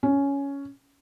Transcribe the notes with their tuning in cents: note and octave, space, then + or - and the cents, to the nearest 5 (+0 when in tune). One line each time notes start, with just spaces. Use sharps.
C#4 +10